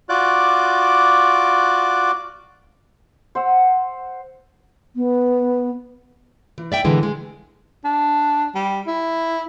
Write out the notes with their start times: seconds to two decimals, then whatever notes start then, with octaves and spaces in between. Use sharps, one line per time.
0.09 F4 F#4 D5 D6 F#6
3.35 C5 F#5 E6
4.96 B3
6.58 E3
6.72 D5 E5 G5
6.85 A#2 D3 E3 G#3
7.03 G#3
7.85 D4
8.55 G3
8.87 E4